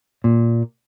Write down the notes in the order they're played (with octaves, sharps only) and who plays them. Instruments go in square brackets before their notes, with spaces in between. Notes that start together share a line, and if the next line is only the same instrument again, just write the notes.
[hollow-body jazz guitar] A#2